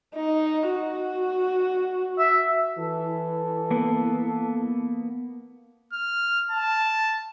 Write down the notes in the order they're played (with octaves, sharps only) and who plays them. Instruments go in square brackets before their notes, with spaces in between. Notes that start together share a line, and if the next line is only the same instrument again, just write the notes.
[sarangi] D#4
F#4
[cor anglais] E5
[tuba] E3 [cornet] A4
[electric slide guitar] A#3 B3
[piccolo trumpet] F6
A5